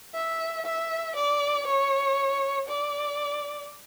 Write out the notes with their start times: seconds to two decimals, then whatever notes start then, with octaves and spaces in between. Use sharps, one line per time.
0.14 E5
0.66 E5
1.16 D5
1.67 C#5
2.68 D5